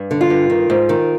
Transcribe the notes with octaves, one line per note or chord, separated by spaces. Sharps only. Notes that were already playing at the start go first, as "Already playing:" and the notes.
Already playing: G2
D3
F4
G2
D#3
G#2
D#3